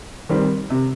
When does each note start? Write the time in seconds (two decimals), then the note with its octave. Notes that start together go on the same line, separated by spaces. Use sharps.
0.29 D#3 G3 C4
0.70 C3